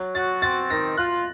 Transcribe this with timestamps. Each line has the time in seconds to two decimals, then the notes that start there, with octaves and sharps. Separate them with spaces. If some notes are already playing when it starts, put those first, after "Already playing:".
Already playing: F#3
0.15 F#4 A6
0.42 C4 A6
0.70 D#3 A#6
0.97 F4 F#6